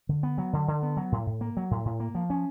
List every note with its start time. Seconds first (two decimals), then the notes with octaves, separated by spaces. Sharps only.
0.09 D3
0.23 B3
0.38 F#3
0.53 D3
0.68 D3
0.83 B3
0.97 F#3
1.12 A2
1.27 A2
1.41 A#3
1.57 F#3
1.71 A2
1.85 A2
2.00 A#3
2.15 F3
2.30 C#4